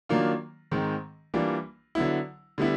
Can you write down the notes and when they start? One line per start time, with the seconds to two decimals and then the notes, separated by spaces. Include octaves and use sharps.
0.09 D#3 F#3 A#3 D4 F4
0.71 G#2 D#3 G#3 C4
1.34 E3 G3 A#3 D4 F4
1.95 D3 F#3 B3 E4
2.58 D3 G3 B3 E4